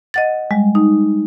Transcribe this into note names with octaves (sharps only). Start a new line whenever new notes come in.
D#5 F#5 A6
G3 G#3
D#4